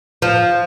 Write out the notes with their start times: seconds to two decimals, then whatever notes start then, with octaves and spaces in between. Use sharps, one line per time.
0.22 F3